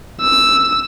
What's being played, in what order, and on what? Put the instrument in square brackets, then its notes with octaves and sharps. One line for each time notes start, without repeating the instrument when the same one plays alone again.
[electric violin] E6